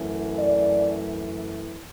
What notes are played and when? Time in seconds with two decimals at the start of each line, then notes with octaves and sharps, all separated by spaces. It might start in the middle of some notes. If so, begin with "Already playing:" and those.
Already playing: F#2 E3 A3
0.39 D5